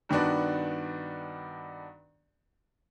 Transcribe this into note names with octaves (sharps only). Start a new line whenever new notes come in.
G2 D#3 B3 D4 F#4